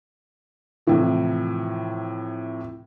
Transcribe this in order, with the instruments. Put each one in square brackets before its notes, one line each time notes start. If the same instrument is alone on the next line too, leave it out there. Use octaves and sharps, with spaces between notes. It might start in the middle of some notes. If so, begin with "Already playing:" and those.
[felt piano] A2 C3 E3 F3